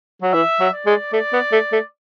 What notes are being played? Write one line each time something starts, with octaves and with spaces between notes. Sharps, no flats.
F#3
E3 E5
F#3
D5
G#3
A3 D5
B3
A3
A3